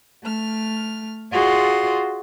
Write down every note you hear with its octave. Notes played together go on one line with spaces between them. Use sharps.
A3 F6
F4 F#4 G#4 D5 C6